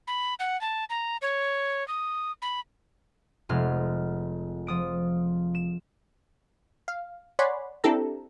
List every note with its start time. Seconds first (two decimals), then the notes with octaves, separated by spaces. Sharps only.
0.07 B5
0.39 F#5
0.61 A5
0.90 A#5
1.22 C#5
1.88 D#6
2.42 B5
3.49 F1 G#3 F6
4.67 F3 D#6 D7
5.55 E7
6.88 F5
7.39 C#5 D5 F#5 G#5 B5 C6
7.84 C4 D4 E4 G4 A4 A#5